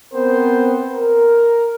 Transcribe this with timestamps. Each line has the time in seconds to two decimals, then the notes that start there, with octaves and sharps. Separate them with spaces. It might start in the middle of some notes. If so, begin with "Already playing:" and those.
0.14 B3 C4 A#4 C5
0.93 A#4